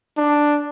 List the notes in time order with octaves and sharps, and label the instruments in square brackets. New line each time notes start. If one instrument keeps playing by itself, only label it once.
[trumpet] D4